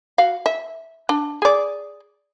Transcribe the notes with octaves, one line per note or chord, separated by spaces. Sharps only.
F#4 F5
E5
D4
G#4 D5